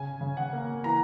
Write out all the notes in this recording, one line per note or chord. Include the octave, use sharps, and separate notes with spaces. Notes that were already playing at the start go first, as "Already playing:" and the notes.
Already playing: C#3 G#5
C#3
F#5
A#3
E3 A#5